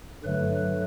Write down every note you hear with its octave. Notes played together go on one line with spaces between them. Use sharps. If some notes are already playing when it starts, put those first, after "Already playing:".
G2 D3 F#3 A3 B4